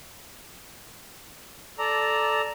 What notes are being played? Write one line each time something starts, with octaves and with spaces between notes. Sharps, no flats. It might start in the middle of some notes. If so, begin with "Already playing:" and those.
A4 D5 A#5